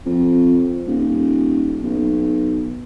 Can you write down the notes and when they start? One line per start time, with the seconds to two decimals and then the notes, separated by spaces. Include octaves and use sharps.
0.06 F2
0.87 D#1
1.83 B1